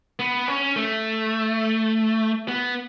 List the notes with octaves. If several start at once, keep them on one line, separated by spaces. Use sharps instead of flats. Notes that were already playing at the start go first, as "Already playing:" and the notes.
B3
C#4
A3
B3